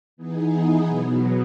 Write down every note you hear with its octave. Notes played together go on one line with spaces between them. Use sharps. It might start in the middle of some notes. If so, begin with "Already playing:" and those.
E3 B3 D#4 G#4
B2 F#3 B3